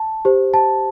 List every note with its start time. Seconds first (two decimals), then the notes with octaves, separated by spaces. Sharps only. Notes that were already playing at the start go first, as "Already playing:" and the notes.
Already playing: A5
0.25 G4 C5
0.54 A5